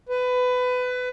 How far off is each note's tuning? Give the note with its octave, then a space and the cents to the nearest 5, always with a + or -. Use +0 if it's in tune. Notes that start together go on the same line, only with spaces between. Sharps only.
B4 +20